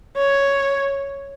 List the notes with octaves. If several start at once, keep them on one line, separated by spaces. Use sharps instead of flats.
C#5